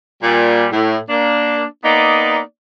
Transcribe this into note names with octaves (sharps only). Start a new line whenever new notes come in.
A#2 G3
A2
A#3 D4
A#3 B3 D#4 D5